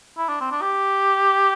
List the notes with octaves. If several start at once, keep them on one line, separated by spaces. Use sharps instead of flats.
E4
D4
C4
D4
G4